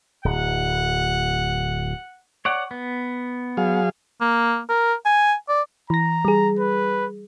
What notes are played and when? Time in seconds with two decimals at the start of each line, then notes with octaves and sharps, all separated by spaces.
0.25 D1 F#5
2.45 C#5 D5 F#5
2.71 B3
3.57 F#3 G#4 F5
4.21 A#3
4.69 A#4
5.05 G#5
5.49 D5
5.90 E3 A#5 A#6
6.25 G3 G#4
6.59 B4